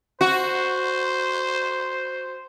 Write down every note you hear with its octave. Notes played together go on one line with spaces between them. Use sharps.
F#4 C5